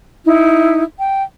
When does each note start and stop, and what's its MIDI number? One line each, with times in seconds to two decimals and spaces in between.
0.24 0.82 63
0.24 0.82 64
0.98 1.22 79